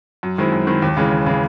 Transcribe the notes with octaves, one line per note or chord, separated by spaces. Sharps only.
F#2
D#3 G#3 C4 E4
F#2
D#3 G#3 C4 E4
D#2
C#3 E3 G#3
D#2
C#3 E3 G#3